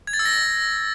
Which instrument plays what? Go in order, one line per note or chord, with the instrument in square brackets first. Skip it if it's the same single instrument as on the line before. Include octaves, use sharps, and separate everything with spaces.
[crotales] G#6
A6
E6
A#6